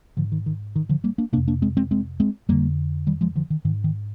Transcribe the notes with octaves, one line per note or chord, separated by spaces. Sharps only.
G#2 D3 F3
D#3
D#3
D#3
D3 F3
G3 A#3
A#3 D4
F2 C3 A#3 D4
A#3 D4
G#3 C4
G#3 C4
G#3 C4
G#3 C4
F2 D3 G3 A#3
D#3 G3
F3 G#3
D3 F3
D#3
G#2 D#3
D#3